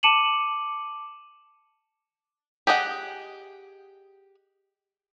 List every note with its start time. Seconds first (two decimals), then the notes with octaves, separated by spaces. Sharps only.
0.03 A5 D6 C#7 D#7 E7 F#7
2.67 G4 G#4 D#5 F#5